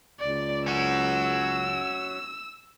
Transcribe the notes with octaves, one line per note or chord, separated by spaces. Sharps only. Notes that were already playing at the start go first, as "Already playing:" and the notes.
C#2 D5
C#4 F#4 E6